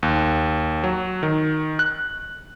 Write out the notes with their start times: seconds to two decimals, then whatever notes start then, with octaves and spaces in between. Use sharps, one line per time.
0.03 D#2
0.84 F#3
1.23 D#3
1.79 F#6